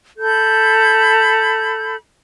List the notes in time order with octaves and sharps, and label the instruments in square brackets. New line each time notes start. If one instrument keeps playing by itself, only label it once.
[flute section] A4 B5 G6